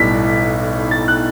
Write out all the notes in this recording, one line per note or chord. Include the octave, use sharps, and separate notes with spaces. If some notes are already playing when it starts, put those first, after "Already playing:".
Already playing: B1 A2 G3 B3 B6
A6
F#6